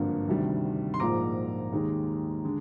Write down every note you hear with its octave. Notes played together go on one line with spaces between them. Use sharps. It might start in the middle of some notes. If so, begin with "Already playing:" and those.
Already playing: G#1 G2 D3 F3 A#3
D2 C3 D#3 G3 D4
C6
A#1 G#2 F3 A#3 A#5 D6
D#2 D#3 G#3 D#4
D3 G#3